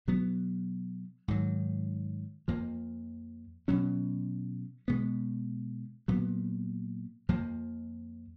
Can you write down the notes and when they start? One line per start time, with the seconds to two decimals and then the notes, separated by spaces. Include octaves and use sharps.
0.08 B2 F#3 B3
1.28 G#2 D#3 F#3
2.48 F2 F3 A#3
3.68 B2 F#3 C#4
4.88 B2 G#3 B3
6.08 A#2 F#3 B3
7.29 F2 F3 A#3